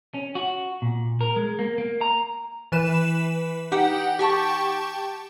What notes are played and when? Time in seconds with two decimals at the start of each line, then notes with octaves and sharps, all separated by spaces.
0.14 C#4
0.35 F#4
0.82 A#2
1.21 A#4
1.36 G#3
1.59 A#3
1.78 A#3
2.01 A#5
2.72 E3 B4 E7
3.72 D#4 G4 F#5 G5
4.19 G4 G5 A5 C#6